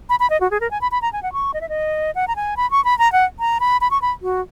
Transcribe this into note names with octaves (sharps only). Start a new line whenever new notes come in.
B5
B5
D#5
F#4
G#4
A#4
G#5
B5
B5
A#5
G#5
F#5
C#6
D#5
E5
D#5
F#5
A#5
G#5
B5
C#6
B5
A#5
F#5
A#5
B5
B5
C#6
B5
F#4